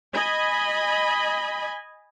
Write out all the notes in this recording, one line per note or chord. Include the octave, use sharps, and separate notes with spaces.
D#5 G#5 B5